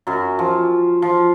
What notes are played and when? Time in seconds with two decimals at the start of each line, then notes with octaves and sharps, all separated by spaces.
0.07 F#2 F#3
0.39 F3
1.02 F3